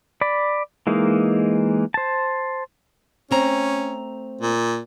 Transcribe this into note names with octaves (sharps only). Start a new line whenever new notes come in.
D5 B5
E3 G#3 A#3 D#4
C5 A5
A3 C4 C#4 A#5
A#2